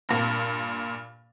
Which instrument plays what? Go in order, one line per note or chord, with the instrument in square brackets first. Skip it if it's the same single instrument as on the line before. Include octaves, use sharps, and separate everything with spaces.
[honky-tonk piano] G2 A#2